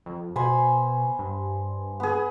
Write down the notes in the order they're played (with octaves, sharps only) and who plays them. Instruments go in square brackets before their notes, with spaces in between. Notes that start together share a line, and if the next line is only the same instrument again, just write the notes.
[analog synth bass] F2
[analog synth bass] B2 [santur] C5 G#5 B5
[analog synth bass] G2
[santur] B3 G#4